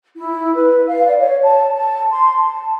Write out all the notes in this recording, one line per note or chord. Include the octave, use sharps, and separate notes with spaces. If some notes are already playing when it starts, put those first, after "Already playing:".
E4
B4
F5
D5
C#5
A5
A5
C6
A5